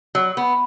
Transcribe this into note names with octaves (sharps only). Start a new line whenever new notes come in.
F#3
B3